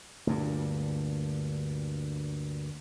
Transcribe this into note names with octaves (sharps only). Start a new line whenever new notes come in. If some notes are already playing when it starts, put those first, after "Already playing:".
D2 G2 A#2